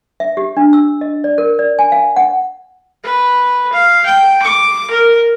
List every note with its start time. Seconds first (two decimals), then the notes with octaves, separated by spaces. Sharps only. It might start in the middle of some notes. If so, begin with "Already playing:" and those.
0.20 E5
0.37 G4
0.57 D4
0.73 E6
1.01 D#5
1.24 D5
1.38 A#4
1.59 D5
1.79 G#5
1.92 F5
2.16 F#5
3.04 B4
3.73 F5
4.06 G5
4.42 D6
4.90 A#4